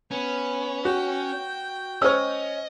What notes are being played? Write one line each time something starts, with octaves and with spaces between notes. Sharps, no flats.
B3 C#4
F#4 G5
C#4 C5 C#5 D#5 E6